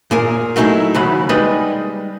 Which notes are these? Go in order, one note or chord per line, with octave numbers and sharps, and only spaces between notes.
A#2 G#4 A#4
F#3 A3 D#4 E4 G#4
D#2 C#3 F#3 F#5 B5
G3 G#3 D#4 B4 D5 D#5